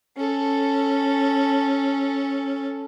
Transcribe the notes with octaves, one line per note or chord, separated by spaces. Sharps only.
C#4 A4